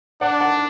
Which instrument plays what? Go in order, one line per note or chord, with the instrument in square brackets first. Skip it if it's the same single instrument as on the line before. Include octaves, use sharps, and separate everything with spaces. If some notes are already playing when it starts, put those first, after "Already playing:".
[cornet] D4 [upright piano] D5 F#5
[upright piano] F#5 A5